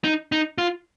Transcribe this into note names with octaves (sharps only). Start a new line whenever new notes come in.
D#4
D#4
F4